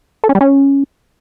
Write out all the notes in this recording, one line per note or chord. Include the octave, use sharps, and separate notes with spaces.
A4
C#4
G3
C#4